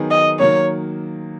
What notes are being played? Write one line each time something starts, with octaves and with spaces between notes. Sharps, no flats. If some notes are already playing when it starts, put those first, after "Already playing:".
Already playing: D#3 F#3 B3 D#4 G#4
D#5
D#3 F#3 A#3 C#5